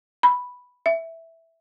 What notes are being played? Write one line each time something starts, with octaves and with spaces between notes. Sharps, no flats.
B5
E5